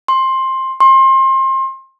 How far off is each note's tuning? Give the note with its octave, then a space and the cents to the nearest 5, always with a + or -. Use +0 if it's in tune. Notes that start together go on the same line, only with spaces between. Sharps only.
C6 +15
C6 +30